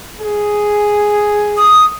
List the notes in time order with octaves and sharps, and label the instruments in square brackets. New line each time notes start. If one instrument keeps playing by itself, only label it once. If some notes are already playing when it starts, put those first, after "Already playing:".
[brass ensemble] G#4
[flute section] D#6